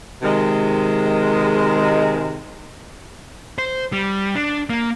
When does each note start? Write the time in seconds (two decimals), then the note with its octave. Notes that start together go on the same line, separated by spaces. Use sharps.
0.23 C3 D#3 G#3
3.58 C5
3.92 G3
4.35 D4
4.70 A#3